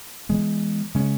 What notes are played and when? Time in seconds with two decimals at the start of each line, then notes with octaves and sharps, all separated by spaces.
0.29 E3 G#3 B3
0.94 C#3 G#3 C#4